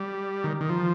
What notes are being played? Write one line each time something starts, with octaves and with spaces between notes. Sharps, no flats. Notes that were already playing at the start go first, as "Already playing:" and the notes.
Already playing: G3
D#3
D#3
F3